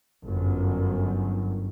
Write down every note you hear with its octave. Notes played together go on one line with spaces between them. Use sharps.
G1 F#2